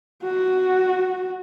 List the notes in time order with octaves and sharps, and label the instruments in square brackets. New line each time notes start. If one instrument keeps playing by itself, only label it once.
[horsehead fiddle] F#4